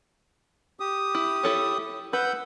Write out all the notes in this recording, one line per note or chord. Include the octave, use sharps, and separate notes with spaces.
G4 D#6
E4
E4 A4 C#5
B4 F#5 E6 G6